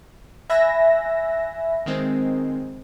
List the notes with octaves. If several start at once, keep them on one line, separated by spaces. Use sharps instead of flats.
E5 G#5 B5 E6 F#6 A#6
D#3 G#3 C4